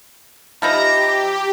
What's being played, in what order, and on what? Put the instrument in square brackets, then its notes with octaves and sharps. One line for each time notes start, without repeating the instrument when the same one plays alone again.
[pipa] F3 D#4 E4 [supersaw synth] G4 [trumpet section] A#5